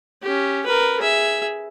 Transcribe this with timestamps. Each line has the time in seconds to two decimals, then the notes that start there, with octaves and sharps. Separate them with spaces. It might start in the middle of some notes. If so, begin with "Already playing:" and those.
0.23 C#4 G4
0.66 A#4 B4
1.00 G#4 E5